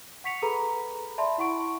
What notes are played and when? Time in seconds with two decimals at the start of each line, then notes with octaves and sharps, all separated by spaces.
0.24 F#5 C#6 B6 C#7 F7
0.42 G#4 A4 B4 A#5 B5
1.18 D5 E5 A5 B5 C6
1.38 E4 F#5 C#6 D7